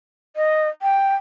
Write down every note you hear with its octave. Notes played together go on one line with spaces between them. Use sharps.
D#5
G5